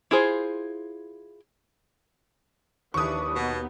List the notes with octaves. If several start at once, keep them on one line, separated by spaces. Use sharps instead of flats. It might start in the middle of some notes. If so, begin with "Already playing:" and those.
E4 F4 G#4 C5
D#2 E3 D4 B4 C#6 D#6
B2 B3 D#4